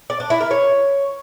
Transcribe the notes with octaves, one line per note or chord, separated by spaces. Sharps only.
D5
D4
E4
A#4
C#5